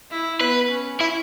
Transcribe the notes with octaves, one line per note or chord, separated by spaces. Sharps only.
E4
B3 B4
C#4
E4